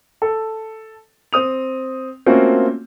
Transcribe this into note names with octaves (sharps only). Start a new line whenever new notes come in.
A4
C4 D#6 F7
A3 A#3 C4 C#4 F4 F#4